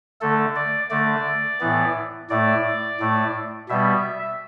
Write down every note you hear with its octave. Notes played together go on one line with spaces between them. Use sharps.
D3 A3 A4
D5
D3 A3 D5
A2 E3 B3
A2 A3 D5
A2 A3
B2 G3 B3 E5